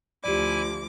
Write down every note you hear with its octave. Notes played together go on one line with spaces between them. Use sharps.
D2 F3 E4 G4 D5 G#5 D6